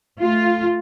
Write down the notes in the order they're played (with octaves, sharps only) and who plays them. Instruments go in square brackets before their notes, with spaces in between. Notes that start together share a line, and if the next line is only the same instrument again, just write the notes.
[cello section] A3 F4